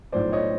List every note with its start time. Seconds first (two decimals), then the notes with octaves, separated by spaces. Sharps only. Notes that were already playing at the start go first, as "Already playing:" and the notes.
0.12 B1 A2 F3 C5 D5
0.32 C#5 D#5